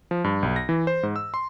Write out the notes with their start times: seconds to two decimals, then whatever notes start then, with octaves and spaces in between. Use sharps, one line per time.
0.11 F3
0.24 G2
0.43 B1
0.56 A#6
0.69 E3
0.87 C5
1.03 G#2
1.16 E6
1.34 C6